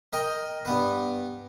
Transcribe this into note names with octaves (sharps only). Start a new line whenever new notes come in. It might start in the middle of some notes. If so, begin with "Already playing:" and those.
A#4 D#5 G5 A#5
G2 B3 B4